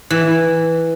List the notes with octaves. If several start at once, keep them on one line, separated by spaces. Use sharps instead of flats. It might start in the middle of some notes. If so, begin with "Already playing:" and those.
E3